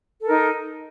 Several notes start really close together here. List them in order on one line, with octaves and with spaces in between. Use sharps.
A4 A#4 D#4